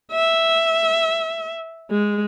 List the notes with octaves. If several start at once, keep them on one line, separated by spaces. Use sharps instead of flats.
E5
G#3